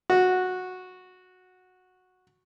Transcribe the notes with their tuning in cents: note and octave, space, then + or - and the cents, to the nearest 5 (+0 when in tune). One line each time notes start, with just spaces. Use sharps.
F#4 -10